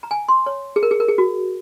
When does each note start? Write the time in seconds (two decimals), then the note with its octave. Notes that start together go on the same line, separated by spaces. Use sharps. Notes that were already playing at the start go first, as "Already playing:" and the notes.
0.03 A#5
0.11 G#5
0.28 C6
0.46 C#5
0.76 G#4
0.83 A#4
0.91 G#4
1.00 A#4
1.08 G#4
1.18 F#4